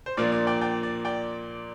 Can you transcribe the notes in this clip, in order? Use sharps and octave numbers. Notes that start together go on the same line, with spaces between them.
C5
A#2 F3 A#3 D4 D5
D5
D5 G5
D5 G5
D5
D5 G5